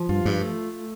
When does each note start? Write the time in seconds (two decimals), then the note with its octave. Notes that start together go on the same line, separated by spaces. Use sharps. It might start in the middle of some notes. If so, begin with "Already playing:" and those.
Already playing: F3
0.09 G2 F4
0.25 G2
0.41 A3